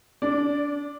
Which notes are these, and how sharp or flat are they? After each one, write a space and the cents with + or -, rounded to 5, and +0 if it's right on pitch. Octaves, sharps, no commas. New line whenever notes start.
D4 -25 D5 +0